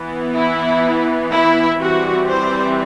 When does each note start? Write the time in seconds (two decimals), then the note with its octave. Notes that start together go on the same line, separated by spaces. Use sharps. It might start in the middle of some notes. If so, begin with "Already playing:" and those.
Already playing: E3 B3
0.34 E4
1.32 E4
1.80 E3 G3 C4 F#4
2.29 C5